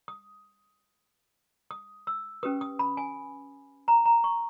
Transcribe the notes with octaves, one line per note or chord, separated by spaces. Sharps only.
D#6
D#6
E6
C#4 G4 B4 D#6
D#6
B5
G#5
A#5
A#5
C#6